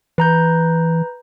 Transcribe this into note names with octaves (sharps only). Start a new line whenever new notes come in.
E3 B4 A#5 G6